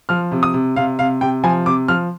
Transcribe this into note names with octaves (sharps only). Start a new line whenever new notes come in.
F3 F6
C3
D#6
C3
C3 F5
C3 F5
C3 G5
F3 G#5
C3 D6
F3 F6